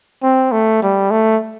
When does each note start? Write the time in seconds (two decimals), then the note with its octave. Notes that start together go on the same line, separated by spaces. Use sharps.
0.23 C4
0.52 A3
0.82 G3
1.11 A3